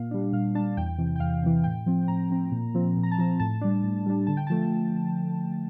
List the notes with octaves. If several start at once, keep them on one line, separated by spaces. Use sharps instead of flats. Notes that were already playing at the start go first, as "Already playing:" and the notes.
Already playing: A#2 F5
G3 D4
A#2 F5
G3 D4 A5
E2 G5
C3 E3
G5
E2 F5
C3 E3
A2 G5
F3 C4
A2 A#5
F3 C4
A#2
F3 C4
A#2
A#5
A5
F3 C4 A#5
A2 A5
G3 D4
A2
G3 D4
D3 A5
G5
F3 A3 A5